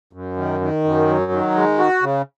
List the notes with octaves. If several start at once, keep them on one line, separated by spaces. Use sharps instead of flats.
F#2
D#3
D#3
F#2
F#3
D#3
G#3
F#4
C#3